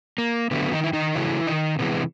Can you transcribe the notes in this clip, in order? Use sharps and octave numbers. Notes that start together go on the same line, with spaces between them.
A#3
D3 F#3 A3 B3
D#3 D#4
E4
D#3 D#4
C#3 E3 F#3 A3 E4
D#3 D#4
C3 E3 G#3 B3